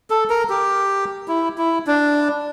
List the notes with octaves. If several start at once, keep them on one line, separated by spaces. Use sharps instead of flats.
A4
A#4
G4
E4
E4
D4